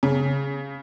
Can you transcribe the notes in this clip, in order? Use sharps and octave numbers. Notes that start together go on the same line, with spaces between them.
C#3